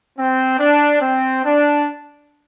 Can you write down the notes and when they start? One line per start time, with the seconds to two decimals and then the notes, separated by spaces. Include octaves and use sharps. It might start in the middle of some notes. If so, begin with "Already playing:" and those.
0.18 C4
0.59 D4
1.01 C4
1.44 D4